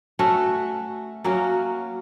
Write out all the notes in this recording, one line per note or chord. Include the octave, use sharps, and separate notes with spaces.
A3 C#4 F#4
F#3 A#3 C#4 F#4